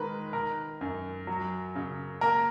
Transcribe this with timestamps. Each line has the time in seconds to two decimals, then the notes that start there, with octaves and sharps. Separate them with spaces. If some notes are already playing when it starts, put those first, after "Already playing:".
Already playing: D#3 G#3 A#4 B4
0.33 D#3 A#4
0.81 F#2
1.27 F#3
1.75 C#3
2.21 A#3 A#4